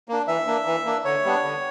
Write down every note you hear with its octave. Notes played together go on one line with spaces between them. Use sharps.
A#3 D4
E3 E5
A#3 D4
E3
A#3 D4
D3 C#5
G3 B3 D4
D3